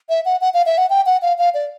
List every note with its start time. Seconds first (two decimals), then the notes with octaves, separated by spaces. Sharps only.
0.09 E5
0.25 F#5
0.41 F#5
0.54 F5
0.66 E5
0.78 F#5
0.90 G5
1.06 F#5
1.22 F5
1.38 F5
1.54 D5